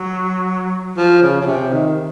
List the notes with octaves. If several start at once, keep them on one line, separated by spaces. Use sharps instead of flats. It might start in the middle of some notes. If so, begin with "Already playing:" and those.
Already playing: F#3
F3
C#3
C#3
C3
D#3